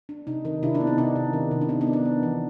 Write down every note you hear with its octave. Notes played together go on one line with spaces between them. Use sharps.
D4
C3 D#4
D#3 D#4
C3 D4 E4
D4
B3
D#4
C3 D4
C3
D#3
C3
D4
B3 D#4
D4
B3
D4
B3
E3